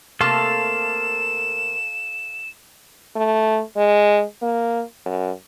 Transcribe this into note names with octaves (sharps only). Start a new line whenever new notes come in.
C3 A3 A#3 A4 F5 A5 E7
A3
G#3
A#3
F#2